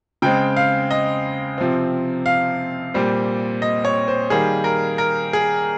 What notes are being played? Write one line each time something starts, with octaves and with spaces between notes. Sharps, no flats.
C#3 G#3 C4 G5
F5
D#5
C3 F3 C4
F5
A#2 G3 C4
D#5
C#5
C5
D#3 G3 A#3 G#4
A#4
A#4
G#4